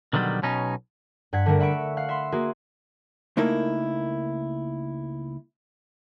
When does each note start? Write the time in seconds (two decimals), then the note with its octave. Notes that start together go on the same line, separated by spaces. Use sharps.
0.13 B2 D3 D#3 F#3 G3
0.42 B1 B2 C#4 D#4
1.33 G2 F#5 G#6 B6
1.46 D3 G3 A3 D4 A#4
1.60 E5 F#5 B5 C#6 D7
1.97 F5 F#5
2.09 E5 B5 C6
2.32 A#3 F#4 G#4
3.37 C#2 A3 A#3 D#4 E4 A#4